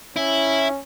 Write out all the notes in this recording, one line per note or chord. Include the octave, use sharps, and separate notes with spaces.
C#4 E4